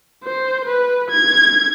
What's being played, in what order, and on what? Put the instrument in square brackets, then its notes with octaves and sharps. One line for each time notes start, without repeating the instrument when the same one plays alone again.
[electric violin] C5
B4
G#6